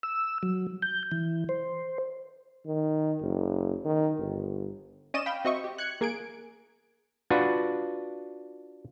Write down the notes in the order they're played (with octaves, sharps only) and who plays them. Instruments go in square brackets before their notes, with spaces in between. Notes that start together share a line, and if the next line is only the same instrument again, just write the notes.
[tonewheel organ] E6
F#3
G6
E3
C5
[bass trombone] D#3
F#1
D#3
G1
[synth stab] C#4 D5 D#5 D#7 E7
F5 G5 B5
C4 F#4 D#5 E5 C#6
G4
F#6 G#6 C#7
A#3 G#4 G#6 D7
[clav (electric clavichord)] D4 F4 F#4 B4